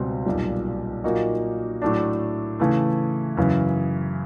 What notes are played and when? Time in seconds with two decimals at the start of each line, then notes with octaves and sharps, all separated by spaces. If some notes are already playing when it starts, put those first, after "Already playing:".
Already playing: C#2 B2 G3 C4
0.26 B1 A#2 G3
1.04 A#2 F#3 A#3 D#4 F#4
1.82 A2 F#3 A3 D4
2.60 C#3 E3 A3
3.37 F#2 C#3 E3